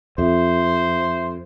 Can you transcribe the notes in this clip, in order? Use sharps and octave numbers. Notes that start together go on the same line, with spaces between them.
F2 C5 E5